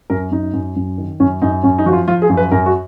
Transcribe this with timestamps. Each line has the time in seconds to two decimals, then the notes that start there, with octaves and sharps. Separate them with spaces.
0.10 F#2 A#4
0.32 F#2 D#4
0.53 F#2
0.76 F#2
0.98 D#3
1.20 F#2 C#4
1.42 F#2 D#4
1.63 F#2 C#4
1.78 D#4
1.86 F3 F#4
1.93 F4
2.08 F3 F4
2.22 G#4
2.30 F#2
2.37 B4
2.51 F#2 A#4
2.66 F#4